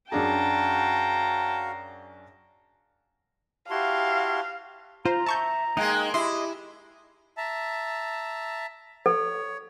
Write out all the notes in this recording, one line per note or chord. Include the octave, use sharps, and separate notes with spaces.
F#2 D4 F#4 G#4 F5 G5 A5 A#5
E4 F#4 G4 F5 A5 C6
F4 C5 A#5
E5 A5 C#6 G6
G#3 A#3 D#4 G5 G#5
E4 G4 D#5 C6
E5 A5 A#5
A4 C#5